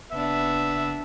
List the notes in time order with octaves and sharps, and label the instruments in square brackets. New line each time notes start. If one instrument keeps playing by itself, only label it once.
[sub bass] F#1 [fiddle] B3 D4 [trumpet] E5